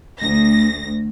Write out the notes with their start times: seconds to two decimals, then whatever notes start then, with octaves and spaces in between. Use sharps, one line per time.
0.20 D2 A#6